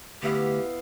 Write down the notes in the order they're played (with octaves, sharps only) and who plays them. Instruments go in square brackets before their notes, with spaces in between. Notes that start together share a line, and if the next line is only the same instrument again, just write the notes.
[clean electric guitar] D2 [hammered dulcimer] B3 E4 F5 [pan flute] G4